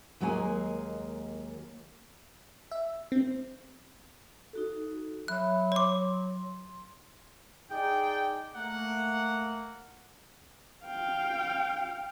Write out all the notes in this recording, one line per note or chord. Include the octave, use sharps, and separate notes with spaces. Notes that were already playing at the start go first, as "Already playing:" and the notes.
D#2 F#3 G#3 A#3 F5 G#5
E5
C4
D#4 F#4 A4
F#3 E5 B5 F#6
C#5 C6 D6
D#4 G#4 D5 G5
A3 A#3 F#5
F5 G5